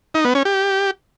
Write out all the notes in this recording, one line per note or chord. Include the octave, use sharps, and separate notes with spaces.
D#4
B3
C#4
G4